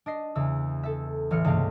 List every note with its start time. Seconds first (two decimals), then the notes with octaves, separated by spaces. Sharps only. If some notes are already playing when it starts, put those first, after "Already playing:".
0.06 D4 D#5 C7
0.35 E2 C#3 E6
0.83 A4 E5
1.31 A1 E3 F6 C#7
1.45 C#2 G2 C3 A3 A#3 F5